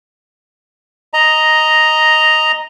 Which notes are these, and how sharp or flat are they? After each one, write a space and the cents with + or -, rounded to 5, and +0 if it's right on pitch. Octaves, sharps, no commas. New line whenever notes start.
D#5 +0 A#5 +0